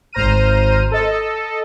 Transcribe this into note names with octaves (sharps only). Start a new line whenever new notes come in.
G#1 C5 A#5 F6 D#7
A4 D#5